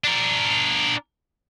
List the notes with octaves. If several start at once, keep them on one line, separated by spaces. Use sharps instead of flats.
D4 A#4